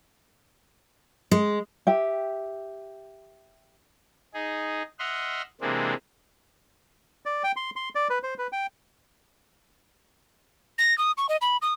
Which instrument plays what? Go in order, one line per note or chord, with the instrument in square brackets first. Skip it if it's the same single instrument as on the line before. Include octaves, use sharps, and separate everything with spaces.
[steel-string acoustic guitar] G#3
[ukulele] G4 E5 G5
[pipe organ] D#4 G#4
D#5 E5 F#5 C6 F6
C3 E3 G#3 A#3 C4 D4
[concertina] D5
G5
C6
C6
D5
B4
C5
B4
G5
[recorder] A#6
D#6
C#6
D#5
B5
D#6